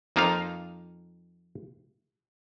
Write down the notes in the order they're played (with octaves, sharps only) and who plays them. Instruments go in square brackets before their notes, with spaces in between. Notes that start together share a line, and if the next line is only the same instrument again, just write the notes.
[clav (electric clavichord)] F2 A#3 D#4 F4 F5